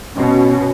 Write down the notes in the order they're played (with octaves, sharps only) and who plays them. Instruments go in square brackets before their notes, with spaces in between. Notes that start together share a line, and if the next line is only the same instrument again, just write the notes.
[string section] B2 [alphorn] C#4